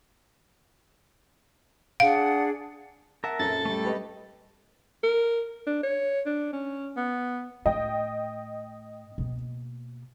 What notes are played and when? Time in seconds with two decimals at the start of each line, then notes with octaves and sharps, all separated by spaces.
2.00 D4 G#4 F5 F#5
3.24 A#4 E5 F#5 A5
3.39 A#1 F#2 A4 A6
3.65 G3 A3
3.85 G4 B4 D#5
5.03 A#4
5.67 D4
5.83 C#5
6.26 D4
6.53 C#4
6.96 B3
7.66 A2 D#5 G5
9.18 B2 A#3